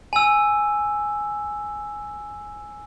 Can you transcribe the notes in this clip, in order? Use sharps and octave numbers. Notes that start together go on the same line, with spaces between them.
G#5 E6